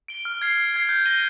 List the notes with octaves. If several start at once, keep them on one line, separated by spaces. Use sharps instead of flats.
D7 G7
F6
G#6 C7
F6
G#6 C7
G6
A#6 D#7 G7